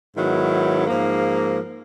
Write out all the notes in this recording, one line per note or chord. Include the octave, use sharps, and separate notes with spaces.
G#2 D#3 F#3 B3 E4
G#2 F3 A#3